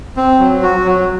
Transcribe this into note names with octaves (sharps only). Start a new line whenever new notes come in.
C4
F#3
F#4
F#3